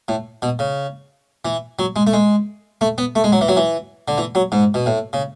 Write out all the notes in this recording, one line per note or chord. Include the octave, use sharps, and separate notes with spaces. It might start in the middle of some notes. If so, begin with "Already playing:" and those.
A2
B2
C#3
E3
F#3
G#3
A3
G#3
A3
B3
A3
G#3
F#3
E3
F#3
E3
D3
E3
F#3
G#2
B2
A2
C#3